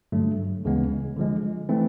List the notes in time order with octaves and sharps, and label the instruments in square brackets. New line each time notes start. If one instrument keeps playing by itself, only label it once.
[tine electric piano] G2 D3 F#3 A3
D2 C#3 E3 G#3 B3
D3 F3 G#3
E3 A3 C4